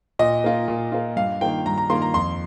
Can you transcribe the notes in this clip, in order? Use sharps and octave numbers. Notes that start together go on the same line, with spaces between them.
A#2 D#5
A#3 F4
A#2
A#3 F4
G2 F5
D#3 A#3 F4 G5
G2 A#5
A#5
D#3 A#3 F4 C6
A#5
F2 C6